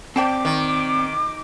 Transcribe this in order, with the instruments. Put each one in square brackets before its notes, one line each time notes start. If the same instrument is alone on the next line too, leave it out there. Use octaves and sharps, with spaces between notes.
[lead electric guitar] C4 D5 [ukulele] C5 G5 A5 [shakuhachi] D6
[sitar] D#3